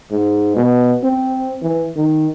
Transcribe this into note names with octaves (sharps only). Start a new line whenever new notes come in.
G#2
B2
C4
E3
D#3